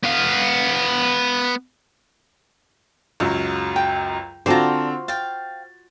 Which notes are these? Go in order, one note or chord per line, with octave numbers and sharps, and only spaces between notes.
B3 F5
C#2 F#2 F#3
G5
D3 C4 F4 F#4 C5 D5 A5 A#5
F5 G5 A6